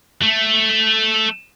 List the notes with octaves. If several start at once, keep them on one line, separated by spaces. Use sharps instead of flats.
A3